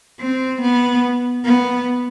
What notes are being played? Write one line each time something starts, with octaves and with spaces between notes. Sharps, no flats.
C4
B3
B3